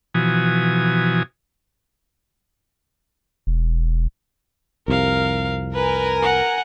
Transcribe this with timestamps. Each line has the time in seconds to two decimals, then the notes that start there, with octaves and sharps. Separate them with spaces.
0.14 B2 E3 F3 F#4 G#5 D#6
3.47 E1
4.88 C2 F2 C3 A#4 F5
5.75 A#4 B4 G#5
6.23 F#5